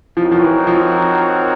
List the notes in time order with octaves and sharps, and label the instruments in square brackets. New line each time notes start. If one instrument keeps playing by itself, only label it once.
[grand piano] F3 [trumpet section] C4 D#4 F#4 A#4 C#5
[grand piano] F3
E3
F3